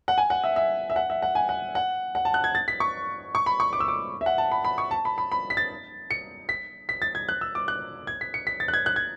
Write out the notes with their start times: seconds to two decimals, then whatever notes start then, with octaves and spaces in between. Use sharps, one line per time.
0.08 F#5
0.18 G#5
0.30 F#5
0.44 E5
0.56 E5
0.90 E5
0.96 F#5
1.10 E5
1.22 F#5
1.35 G#5
1.49 F#5
1.75 F#5
2.15 F#5
2.25 A5
2.34 F#6
2.44 G#6
2.55 A6
2.68 B6
2.80 C#6
3.35 C#6
3.46 B5
3.60 C#6
3.73 D6
3.80 E6
3.88 D6
4.21 E5
4.26 F#5
4.38 A5
4.52 B5
4.64 B5
4.78 C#6
4.91 A5
5.05 B5
5.18 B5
5.32 B5
5.50 B6
5.57 A6
6.11 C#7
6.49 B6
6.89 B6
7.02 A6
7.15 G#6
7.29 F#6
7.41 E6
7.55 D6
7.68 F#6
8.07 G#6
8.21 B6
8.34 C#7
8.47 B6
8.60 A6
8.68 F#6
8.74 G#6
8.86 F#6
8.96 G#6